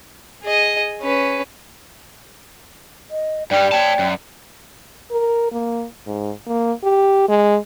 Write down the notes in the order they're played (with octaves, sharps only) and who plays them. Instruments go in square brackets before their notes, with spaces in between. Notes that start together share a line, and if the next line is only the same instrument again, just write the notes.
[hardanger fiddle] G#4 D#5
C#4 B4
[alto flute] D#5
[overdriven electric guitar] G2 G3 [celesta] D5 [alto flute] G5
[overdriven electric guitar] C#5 A5 [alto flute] G5
[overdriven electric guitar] F#2
[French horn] A#4
A#3
G#2
A#3
G4
G#3